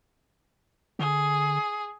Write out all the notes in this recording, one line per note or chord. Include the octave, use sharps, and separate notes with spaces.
D3 G#4